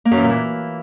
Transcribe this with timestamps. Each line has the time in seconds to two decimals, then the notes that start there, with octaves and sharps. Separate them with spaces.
0.05 A#3
0.11 F#2
0.17 E3
0.23 A#2
0.29 E3